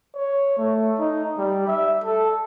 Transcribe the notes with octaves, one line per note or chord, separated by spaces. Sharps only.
C#5
A3
D#4
G3
E5
A4